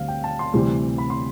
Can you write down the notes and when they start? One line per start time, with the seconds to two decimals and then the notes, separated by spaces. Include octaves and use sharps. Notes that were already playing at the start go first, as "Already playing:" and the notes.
Already playing: D2 D3 G3 C4 F5
0.08 G5
0.24 A5
0.39 C6
0.54 D2 C3 E3 G3 C4 C6
0.98 B5
1.10 C6